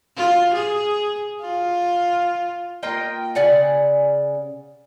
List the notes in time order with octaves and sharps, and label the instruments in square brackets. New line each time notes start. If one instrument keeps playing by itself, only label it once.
[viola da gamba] F4
G#4
F4
[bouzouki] A#3 F4 D#5 G5
C#3 D5 F#5 G#5